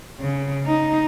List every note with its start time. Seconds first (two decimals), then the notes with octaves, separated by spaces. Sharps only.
0.20 C#3
0.66 D#4